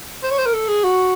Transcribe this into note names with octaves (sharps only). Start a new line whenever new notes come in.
C5
C#5
C5
A#4
A4
G#4
F#4